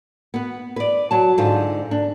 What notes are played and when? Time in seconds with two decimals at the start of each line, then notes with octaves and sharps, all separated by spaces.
0.34 B3 B4
0.76 B4 D5
1.11 F#3 A5
1.38 G#2 D3 F4 C5
1.91 D4